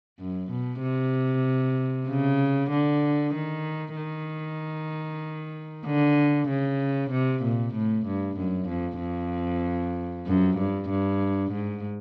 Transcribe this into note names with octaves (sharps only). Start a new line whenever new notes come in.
F#2
B2
C3
C#3
D3
D#3
D#3
D3
C#3
C3
A#2
A2
G2
F#2
F2
F2
F#2
G2
G2
G#2